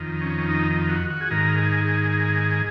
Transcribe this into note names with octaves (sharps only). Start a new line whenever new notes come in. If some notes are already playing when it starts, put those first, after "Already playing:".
Already playing: F2 D#3
C#4
D#4
F#4
F#4
G#4
G#2 D#3 A#4
G#4
G#4